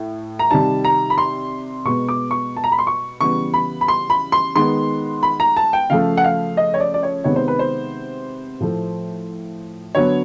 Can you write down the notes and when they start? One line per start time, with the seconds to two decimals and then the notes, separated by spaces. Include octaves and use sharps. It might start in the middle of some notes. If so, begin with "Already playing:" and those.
Already playing: A2
0.39 A#5
0.51 C3 D#3 G3 A5
0.85 A#5
1.10 B5
1.18 C6
1.85 B2 G#3 B3 C#6
2.09 D6
2.31 C#6
2.57 A5
2.64 A#5
2.72 B5
2.79 C6
2.87 C#6
3.21 C#3 E3 G3 B3 C#6
3.54 B5
3.81 B5
3.88 C6
4.10 B5
4.32 C6
4.56 D#3 G#3 B3 C6
5.23 B5
5.40 A#5
5.57 A5
5.73 G5
5.90 C#3 F3 A3 F5
6.17 F#5
6.24 F5
6.57 D#5
6.74 C#5
6.80 D5
6.94 D5
7.03 C#5
7.24 C3 D#3 G#3 B3 C#5
7.36 C5
7.48 B4
7.59 C5
8.60 A2 F3 A3
9.95 D3 F#3 B3 C#5